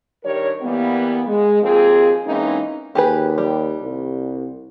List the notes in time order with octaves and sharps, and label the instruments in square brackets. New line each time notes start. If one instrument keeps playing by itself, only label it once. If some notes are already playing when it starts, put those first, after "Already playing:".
[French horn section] G2 D#3 G3 A#4 C#5
E3 G3 A#3 B3
G#3
D#2 F3 A#3 C4 G#4
E3 G#3 A#3 C4 C#4 D#4
[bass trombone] D#2 [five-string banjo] G4 G#4 B4
[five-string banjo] G3
[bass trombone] C2